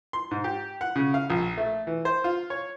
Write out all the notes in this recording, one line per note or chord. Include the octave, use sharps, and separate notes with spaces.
C6
G#2
G4
F#5
C#3
F5
A#1
A3
E3
C5
F4
C#5